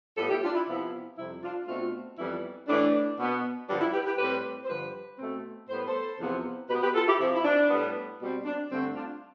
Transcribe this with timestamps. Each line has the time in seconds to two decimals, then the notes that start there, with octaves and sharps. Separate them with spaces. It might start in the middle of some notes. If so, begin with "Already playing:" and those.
0.17 A2 G3 B3 F4 A4
0.30 E4 G4
0.43 D4 F4
0.55 E4
0.67 C3 F3 B3 E4
1.17 F2 C3 G3 C4 E4
1.42 D4 F4
1.68 B2 A3 C4 D4 F4
2.18 F2 E3 G3 B3 E4
2.68 A2 E3 A3 D4
3.18 B2 B3
3.68 G2 D3 F3 D4
3.81 E4
3.93 G4 B4
4.06 G4 B4
4.18 A2 G3 C4 G4 B4
4.64 C5
4.69 G2 D3 F3 G4 B4
5.19 B2 A3 C4
5.69 A2 G3 B3 C5
5.78 B4
5.87 A4 C5
6.19 E2 C3 F3 B3
6.69 B2 G4 B4
6.73 B3
6.82 G4 B4
6.94 F4 A4
7.07 E4 G4
7.20 C3 F3 C4 E4
7.35 E4
7.45 D4
7.70 A2 G3 B3
8.20 B2 G3 C4
8.45 D4
8.70 G2 D3 A3 C4
8.95 D4 F4